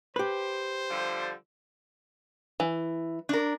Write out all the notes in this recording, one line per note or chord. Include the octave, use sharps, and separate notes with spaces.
G4 B4 C5
D3 F3 G3
E3
D4 A#4